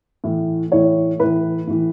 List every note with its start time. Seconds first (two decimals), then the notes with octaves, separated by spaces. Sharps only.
0.24 A2 E3
0.72 A2 E3 C#5
1.19 A2 E3 B4
1.67 A2 E3